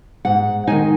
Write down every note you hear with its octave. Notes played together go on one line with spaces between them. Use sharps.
G#2 F#5
D#3 G#3 D#4 G#5